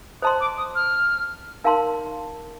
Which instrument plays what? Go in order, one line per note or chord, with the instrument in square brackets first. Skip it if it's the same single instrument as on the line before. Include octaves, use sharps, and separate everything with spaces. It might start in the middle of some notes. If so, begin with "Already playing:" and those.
[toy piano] C5 D#5 A5 C6 [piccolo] D#6
[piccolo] D6
D#6
F6
[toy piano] D#4 A#4 F5 A5 C6